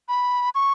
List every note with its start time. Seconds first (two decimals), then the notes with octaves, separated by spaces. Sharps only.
0.09 B5
0.55 C#6